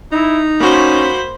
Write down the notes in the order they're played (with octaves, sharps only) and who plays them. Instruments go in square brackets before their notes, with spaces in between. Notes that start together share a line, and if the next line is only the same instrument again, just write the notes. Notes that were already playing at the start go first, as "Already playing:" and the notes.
[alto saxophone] D#4 [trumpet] E4
[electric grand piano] A#3 F#4 [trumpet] C#4 [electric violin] C5 B5